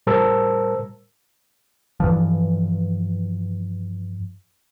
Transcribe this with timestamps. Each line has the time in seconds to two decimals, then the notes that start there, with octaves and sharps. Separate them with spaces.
0.07 A2 G3 A#4 C5 A5 E6
2.00 G2 E3 F3